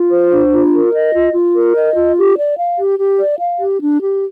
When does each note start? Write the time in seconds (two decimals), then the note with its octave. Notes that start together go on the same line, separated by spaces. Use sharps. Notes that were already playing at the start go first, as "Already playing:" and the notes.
Already playing: F4
0.11 C5
0.31 D4
0.52 F4
0.72 A#4
0.93 D#5
1.14 F4
1.34 F4
1.54 A#4
1.75 D#5
1.95 F4
2.16 G4
2.37 D5
2.58 F5
2.78 G4
2.99 G4
3.19 D5
3.39 F5
3.59 G4
3.80 D4
4.01 G4